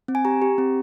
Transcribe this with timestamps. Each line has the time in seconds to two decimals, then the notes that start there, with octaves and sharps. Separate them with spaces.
0.08 C4
0.15 G#5
0.25 G4 A#5
0.42 G4
0.58 C4